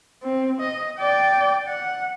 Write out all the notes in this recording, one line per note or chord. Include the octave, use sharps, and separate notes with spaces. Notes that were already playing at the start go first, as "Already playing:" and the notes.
C4
D#5
D5 G5
F#5